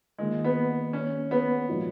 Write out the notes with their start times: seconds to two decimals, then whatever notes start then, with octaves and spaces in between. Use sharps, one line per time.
0.18 D#3 G#3 A#3 F4
0.44 B3
0.93 C#4
1.31 B3
1.69 A#2 F3 G#3 D#4 F#4